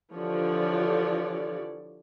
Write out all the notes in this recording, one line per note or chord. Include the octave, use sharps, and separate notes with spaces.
D3 E3 F3 G4 C#5 D5